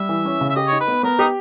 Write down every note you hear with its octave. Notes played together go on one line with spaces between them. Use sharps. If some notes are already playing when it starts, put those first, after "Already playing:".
Already playing: G3 E5
E3
C#4
C#3
E5
G4 D#5
D#4 C#5
B4
B3
B3 A#4
D#4 G4